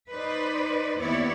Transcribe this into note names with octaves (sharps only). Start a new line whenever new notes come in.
D#4 B4 C5 D5
D#2 B3 C4 E4 C#5 D5